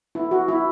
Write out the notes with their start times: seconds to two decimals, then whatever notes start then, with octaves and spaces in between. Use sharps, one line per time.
0.15 E4
0.31 F#4
0.48 E4